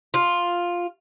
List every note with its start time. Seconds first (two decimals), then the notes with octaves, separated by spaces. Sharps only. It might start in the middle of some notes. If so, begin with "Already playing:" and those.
0.14 F4